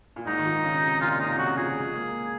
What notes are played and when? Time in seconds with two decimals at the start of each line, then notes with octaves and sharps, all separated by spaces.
0.16 A#2
0.27 G#2 D#4
0.38 D#3
0.45 F3
0.64 C#3
0.82 C3
1.01 A#2 F4
1.11 F4
1.20 C3 D#4
1.38 C#3 F#4
1.57 F3 G#4
1.76 G#3
1.95 A#3